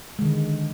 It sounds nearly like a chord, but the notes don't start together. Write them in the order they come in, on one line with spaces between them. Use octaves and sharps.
G#3 D#3 D3